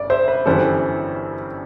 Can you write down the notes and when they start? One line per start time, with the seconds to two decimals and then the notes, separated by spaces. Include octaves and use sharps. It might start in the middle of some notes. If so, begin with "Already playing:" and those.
Already playing: G1 F#2 D5
0.10 C5 E5
0.28 B4
0.46 G1 F#2 E3 G3 A4 C5